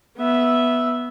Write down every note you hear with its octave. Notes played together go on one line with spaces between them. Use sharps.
B3 E5